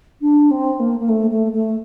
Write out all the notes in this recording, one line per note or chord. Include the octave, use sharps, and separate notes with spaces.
D4
C4
A#3
A#3
A3
A3
A3